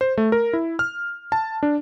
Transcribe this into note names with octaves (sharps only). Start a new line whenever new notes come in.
C5
A3
A#4
E4
F6
A5
D4